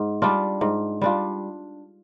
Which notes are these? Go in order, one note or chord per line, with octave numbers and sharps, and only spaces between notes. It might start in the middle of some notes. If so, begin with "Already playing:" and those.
Already playing: G#2
G3 D4 F4
G#2
G3 D4 F4